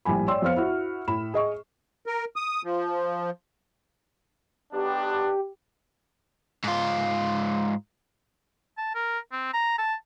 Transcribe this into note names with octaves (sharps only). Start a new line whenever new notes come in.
A#1 A2 G3 G#5 B5
C#5 D5 G5 C6 E6
F2 B3 C5 F5 F6 C#7
E4 F#4
A2 B5 E7
G#4 D#5 C#6
A#4
D#6
F3
B1 B3 D4 G4
G#2 F4
A5
A#4
C4
A#5
A5